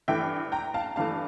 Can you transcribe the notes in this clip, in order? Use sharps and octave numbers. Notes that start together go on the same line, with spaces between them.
G2 E3 A3 E5 G5
G5 A#5
F5 A5
G2 E3 A3 F5 A5